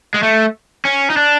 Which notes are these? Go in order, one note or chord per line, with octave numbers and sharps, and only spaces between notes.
G#3
A3
C#4
D#4
D4